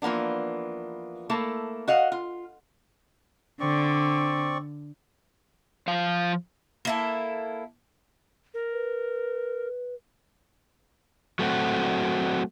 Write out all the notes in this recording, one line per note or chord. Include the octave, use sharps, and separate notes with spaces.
E3 F3 A#3 B3 D4
A3 A#3 E4 A4
F#4 D#5 F5 F#5
F4
D3 C4 D5 C#6
F3 F5
A#3 E4 A4
A#4
B4
F#3 A3 C4 F#4